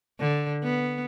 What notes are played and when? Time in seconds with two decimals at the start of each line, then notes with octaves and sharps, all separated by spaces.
0.20 D3
0.64 B3